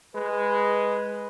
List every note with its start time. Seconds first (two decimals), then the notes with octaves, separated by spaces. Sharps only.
0.15 G#3 B4